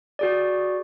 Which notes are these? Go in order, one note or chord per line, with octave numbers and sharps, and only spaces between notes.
F#4 G#4 D5